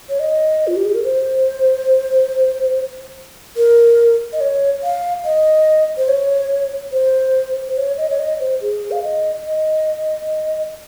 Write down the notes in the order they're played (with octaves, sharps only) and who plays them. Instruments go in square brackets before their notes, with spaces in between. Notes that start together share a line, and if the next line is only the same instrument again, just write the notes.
[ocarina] C#5
D#5
F4
G4
G#4
A#4
C5
A#4
D#5
C#5
F5
D#5
C5
C#5
C5
C5
C#5
D#5
C#5
D#5
C5
G#4
F5
D#5
D#5